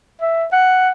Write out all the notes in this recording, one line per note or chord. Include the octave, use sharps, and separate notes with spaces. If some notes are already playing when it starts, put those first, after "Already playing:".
E5
F#5